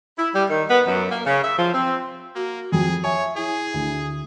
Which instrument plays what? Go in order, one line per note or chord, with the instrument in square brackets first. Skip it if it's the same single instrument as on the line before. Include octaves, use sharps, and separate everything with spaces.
[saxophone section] E4
G3
D#3
B3
F#2
A#3
C#3
E5
F3
C4
[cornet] A#3 [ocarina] F#4
[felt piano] F2 [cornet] G#4
[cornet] C#5 [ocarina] E5 [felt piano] G#5
[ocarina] E4 [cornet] G#4
[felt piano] D2